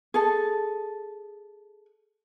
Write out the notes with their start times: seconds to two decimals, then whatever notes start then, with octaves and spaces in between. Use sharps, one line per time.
0.14 G#4 A4